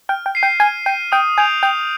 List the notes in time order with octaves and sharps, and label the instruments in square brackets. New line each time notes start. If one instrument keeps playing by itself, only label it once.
[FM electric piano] G5 [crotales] F6
[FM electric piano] G5
[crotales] C7 D#7
[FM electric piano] G5
[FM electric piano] G#5 [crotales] F6
[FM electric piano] G5 [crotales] D#7
[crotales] C7
[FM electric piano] G5 [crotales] D#6
[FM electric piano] G#5 [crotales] G6 D7 F7
[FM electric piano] G5 [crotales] D#6